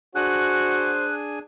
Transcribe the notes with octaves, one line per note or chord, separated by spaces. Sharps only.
D4 F#4 G#4 C5 G#5 F#6